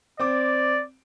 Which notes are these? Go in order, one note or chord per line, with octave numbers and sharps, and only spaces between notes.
C4 D5 D6